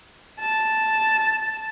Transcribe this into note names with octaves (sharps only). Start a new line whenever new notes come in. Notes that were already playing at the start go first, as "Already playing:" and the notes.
A5